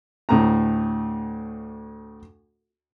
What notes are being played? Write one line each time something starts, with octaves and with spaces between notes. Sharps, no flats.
D2 A2 A#5